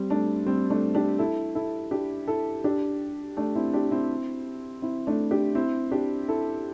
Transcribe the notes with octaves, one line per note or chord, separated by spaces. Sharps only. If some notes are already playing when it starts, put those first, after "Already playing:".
Already playing: G3 C4
A3 D4
G3 C4
A3 D4
D4 G4
E4 A4
E4 A4
D4 G4
E4 A4
D4 G4
A3 D4
C4 E4
D4 G4
C4 E4
C4 E4
A3 D4
D4 G4
C4 E4
D4 G4
E4 A4